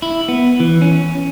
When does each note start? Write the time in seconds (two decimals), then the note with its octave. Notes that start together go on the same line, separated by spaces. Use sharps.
0.02 E4
0.28 B3
0.60 E3
0.82 C#4